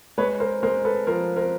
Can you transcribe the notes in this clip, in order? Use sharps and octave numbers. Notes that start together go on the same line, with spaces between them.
G#3 B4 C#5
A#4 C5
G#3 A#4 C5
A4 B4
F3 A#4 C5
A#4 C5